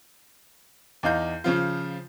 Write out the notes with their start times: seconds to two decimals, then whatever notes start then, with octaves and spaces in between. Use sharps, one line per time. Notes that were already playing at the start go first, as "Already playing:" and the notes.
1.03 E2 D#4 F5 G6
1.44 C#3 F3 F4